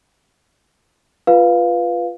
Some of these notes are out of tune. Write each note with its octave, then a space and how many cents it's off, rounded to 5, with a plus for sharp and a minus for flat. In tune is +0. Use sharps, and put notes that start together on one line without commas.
F4 -5 B4 +0 F5 +0